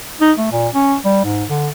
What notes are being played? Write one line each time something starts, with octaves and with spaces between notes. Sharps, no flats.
D#4
A3
A#2
C#4
G3
G#2
D3